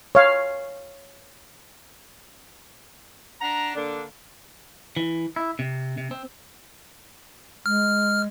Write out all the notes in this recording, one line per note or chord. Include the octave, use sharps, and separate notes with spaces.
C#5 F5
D4 F#5 A#5
D3 A#3 D4
E3
E4
C3
C3
C4
G#3 F6